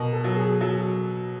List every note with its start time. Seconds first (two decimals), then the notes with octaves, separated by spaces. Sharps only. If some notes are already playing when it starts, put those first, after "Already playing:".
Already playing: B2 A#4
0.13 A4
0.24 F#3
0.36 G#4
0.61 F#3 A4